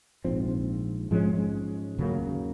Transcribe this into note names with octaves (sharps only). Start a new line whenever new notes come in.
A#1 G#2 F3 C4
G#2 F3 G#3 C#4
D#2 C#3 F#3 A#3